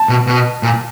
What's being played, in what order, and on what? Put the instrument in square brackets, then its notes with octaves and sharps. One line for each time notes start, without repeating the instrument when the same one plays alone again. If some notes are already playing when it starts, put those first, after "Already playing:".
Already playing: [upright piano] A5
[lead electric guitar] B2
B2
A#2